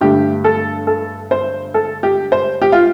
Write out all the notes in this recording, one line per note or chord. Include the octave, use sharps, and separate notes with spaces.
G2 D3 A3 G4
A4
A4
C5
A4
G4
C5
G4
F4